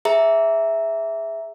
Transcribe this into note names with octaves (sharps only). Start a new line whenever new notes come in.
G#4 E5 A#5